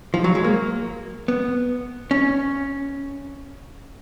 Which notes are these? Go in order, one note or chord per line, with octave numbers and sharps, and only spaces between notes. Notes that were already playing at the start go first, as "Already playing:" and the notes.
F3
F#3
G#3
A#3
B3
C#4